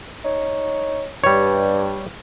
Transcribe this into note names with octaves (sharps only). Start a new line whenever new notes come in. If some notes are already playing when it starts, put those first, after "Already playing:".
D#4 C#5
G2 G3 C#5